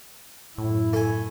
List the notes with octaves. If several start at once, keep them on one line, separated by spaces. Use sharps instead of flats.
F#2 A2 E4
A3 G#5